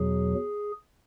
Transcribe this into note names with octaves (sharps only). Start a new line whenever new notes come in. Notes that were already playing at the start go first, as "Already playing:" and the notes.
Already playing: E2 B2 F#3 G#4